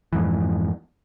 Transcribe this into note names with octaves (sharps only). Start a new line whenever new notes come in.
F2 G#2 E3